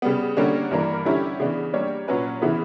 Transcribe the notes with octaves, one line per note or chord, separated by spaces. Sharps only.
C#3 G3 B3
D3 G3 A#3 C#4
G2 E3 A#3 D4 A#4
D3 G3 C#4 E4 G4
C#3 E3 B3 D4
G3 A#3 D4 G4 C#5
A#2 F#3 C#4 F#4 B4
C#3 E3 B3 E4